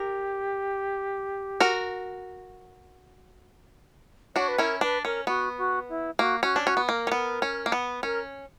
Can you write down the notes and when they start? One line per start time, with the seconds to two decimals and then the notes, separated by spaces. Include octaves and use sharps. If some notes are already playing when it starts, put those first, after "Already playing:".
Already playing: G4 A#4
1.60 F#4 A#4
4.35 D4 F#4 C#5
4.48 B4
4.58 C#4 E4 A#4
4.81 D4 B4
5.05 C#4 A#4
5.27 B3 F#4
5.58 F#4
5.89 E4
6.19 A#3 F#4
6.42 C#4 F#4
6.56 D4
6.65 C#4 F#4
6.77 B3
6.88 A#3 A#4
7.07 C#4
7.12 B3
7.42 C#4
7.66 A#3
7.72 B3
8.03 C#4 A#4